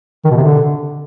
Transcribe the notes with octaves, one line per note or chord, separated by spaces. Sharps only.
D#3
B2
C3
D3